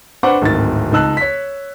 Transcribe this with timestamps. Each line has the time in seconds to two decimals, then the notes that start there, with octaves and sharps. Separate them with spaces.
0.23 D4 B4 C5 F#5 C#6 D6
0.41 D1 G#1 D#3 A6
0.92 C#2 D#4 A5 E6 F#6
1.17 C#5 B6